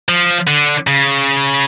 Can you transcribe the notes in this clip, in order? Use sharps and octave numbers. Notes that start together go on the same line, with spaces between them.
F3
D3
C#3